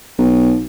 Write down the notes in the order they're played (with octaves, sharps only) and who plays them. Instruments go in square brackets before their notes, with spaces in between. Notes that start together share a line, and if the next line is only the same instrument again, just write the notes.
[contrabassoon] B1